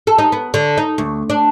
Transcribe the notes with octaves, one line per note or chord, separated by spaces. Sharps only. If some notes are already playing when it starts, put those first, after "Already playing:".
A4
D#4
B3
D3
D#4
D2
D4